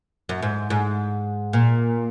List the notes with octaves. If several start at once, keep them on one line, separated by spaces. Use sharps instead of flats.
F#2
G#2
G#2
A#2